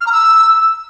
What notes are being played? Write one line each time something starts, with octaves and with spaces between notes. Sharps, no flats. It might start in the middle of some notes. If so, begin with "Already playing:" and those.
F6
A#5
E6